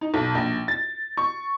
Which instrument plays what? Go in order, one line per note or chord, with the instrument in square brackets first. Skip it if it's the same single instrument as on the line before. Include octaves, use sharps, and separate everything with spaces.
[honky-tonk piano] D#4
B1
A#1
A6
C#6